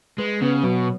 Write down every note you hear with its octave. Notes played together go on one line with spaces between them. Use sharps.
G#3 B4
C#3 B3
B2 F#3